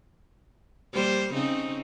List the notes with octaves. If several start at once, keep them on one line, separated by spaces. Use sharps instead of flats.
G3 A#3 C5
C#3 C4 D#4